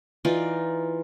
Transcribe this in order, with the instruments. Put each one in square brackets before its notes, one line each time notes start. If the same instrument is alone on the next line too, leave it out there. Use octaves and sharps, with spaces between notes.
[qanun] E3 D#4 F4 D5